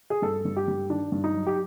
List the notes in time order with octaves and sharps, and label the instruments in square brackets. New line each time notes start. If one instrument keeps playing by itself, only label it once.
[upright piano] G#4
G2 A4
G2
G4
G2
D#3 D4
G2
D#4
F#3
G4